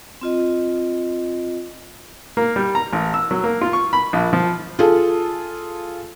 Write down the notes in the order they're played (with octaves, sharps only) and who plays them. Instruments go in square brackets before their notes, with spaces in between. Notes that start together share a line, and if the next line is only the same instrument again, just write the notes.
[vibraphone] C4 F4 D#5
[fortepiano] A#3
G3
A#5
A1
E6
F#3
A#3
F4
C#6
B5
A#1
F3
[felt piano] F4 G#4 A4